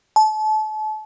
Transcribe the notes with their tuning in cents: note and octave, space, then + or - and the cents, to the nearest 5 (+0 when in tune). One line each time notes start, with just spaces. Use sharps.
A5 -35